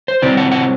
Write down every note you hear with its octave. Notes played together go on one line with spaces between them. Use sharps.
C5
C3 F#3 C4 E4 D5
F#5
F#5